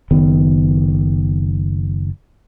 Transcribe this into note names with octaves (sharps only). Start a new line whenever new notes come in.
F#1 D#3 B3